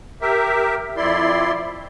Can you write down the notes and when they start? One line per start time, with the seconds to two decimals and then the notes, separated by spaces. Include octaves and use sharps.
0.22 G4 A#4 E5
0.97 F2 E4 D5 C6